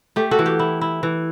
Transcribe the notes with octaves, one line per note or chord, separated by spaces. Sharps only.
A3 G4
F#4 A4
E3
G4
E4
E4
E3